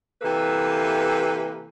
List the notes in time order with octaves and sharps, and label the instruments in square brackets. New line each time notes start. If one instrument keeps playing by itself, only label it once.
[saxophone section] C3 E3 A#3 A4 B4